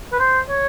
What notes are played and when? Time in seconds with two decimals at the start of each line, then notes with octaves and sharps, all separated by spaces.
0.12 B4
0.19 C5
0.49 C#5